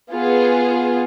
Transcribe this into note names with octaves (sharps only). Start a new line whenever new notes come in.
B3 F4 G#4